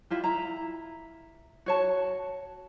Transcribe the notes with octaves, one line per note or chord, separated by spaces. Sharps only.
E4 F4 G4
E4 A#5
F#4 C#5 A5